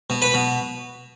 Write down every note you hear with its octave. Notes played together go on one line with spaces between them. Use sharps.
B2
B4 B5
B2